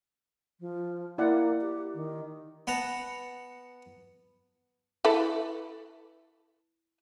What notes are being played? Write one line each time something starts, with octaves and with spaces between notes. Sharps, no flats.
F3
A#3 E4 D5 F#5
G4
D#3
B3 F#5 A5 A#5
E4 A4 B4